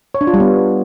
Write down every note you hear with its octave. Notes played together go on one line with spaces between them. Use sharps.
C#5
D4
F4
G3
B3